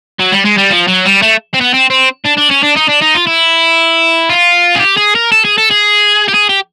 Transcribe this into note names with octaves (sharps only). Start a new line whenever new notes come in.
F#3
G3
G#3
G3
F3
F#3
G3
A3
C4
B3
C4
C4
D4
D4
C#4
D4
D#4
D4
D#4
F4
E4
F4
G#4
G4
G#4
A#4
A4
G#4
A4
G#4
G4
G#4
G4